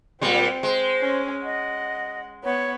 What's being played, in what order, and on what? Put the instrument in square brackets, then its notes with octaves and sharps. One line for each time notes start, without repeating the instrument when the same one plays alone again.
[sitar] A#2 G3 G#3 [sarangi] C4
[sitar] G#3 [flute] C5
[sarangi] C#4
[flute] D#5 [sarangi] F#5
[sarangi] B3 [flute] C#5